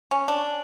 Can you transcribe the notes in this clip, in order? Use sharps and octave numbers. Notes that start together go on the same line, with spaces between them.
C#4
D4